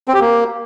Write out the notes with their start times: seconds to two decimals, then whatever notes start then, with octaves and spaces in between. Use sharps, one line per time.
0.08 C4
0.14 G4
0.21 A#3